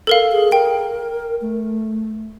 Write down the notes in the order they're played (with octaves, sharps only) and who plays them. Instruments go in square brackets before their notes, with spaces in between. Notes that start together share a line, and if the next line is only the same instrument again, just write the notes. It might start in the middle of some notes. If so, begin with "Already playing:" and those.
[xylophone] A4 A#4 F5
[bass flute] G#4
[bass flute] A#4 [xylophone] G5
[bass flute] A3